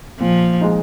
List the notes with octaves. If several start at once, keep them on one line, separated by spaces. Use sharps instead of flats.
A#2 F3
G#3 D#4